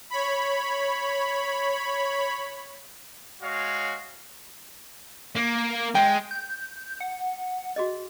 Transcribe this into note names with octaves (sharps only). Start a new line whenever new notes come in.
C#5 B5
G#3 F#4 C#5 F5
A#3
G#3 G5
G6
F#5
F#4 G#4 D#5